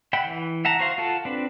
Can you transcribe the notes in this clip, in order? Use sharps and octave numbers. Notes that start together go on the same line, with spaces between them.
E5 F#5 G5 B5
E3
E5 F#5 A5 A#5
F#4 C5 F5
F4 A4 F#5 A5
C4 D4 B4